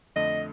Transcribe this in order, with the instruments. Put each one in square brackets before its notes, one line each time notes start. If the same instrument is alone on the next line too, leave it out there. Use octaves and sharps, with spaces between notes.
[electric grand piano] F2 D3 A3 [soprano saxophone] D#5